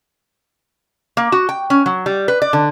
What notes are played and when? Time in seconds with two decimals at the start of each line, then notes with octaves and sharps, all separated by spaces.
1.17 A#3
1.32 F#4
1.49 G5
1.70 C#4
1.86 F#3
2.06 G3
2.28 B4
2.42 D5
2.53 D3